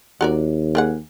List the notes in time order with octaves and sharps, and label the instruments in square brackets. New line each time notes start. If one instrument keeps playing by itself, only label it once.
[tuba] D#2 [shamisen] F#4 A#4 D5
[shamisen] A#3 G#4 F#5